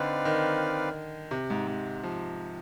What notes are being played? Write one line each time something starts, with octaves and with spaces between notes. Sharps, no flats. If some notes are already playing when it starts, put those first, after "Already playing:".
Already playing: D3 C4 D#4 B4 D5 F5
D#3
C3
G#2
G#2
F3